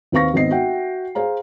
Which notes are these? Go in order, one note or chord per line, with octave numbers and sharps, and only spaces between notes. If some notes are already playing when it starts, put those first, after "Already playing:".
D#2 C4 B4 F5 C#6 A#6
G#1 B3 C4 D#5 C7
F#4 E5 F#5 G5
G#4 C5 F5 A#5